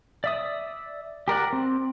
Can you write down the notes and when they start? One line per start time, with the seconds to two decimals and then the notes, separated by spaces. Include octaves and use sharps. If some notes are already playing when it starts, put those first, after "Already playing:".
0.24 D5 E5 D#6
1.28 G4 A#4 D5 F#5
1.53 C4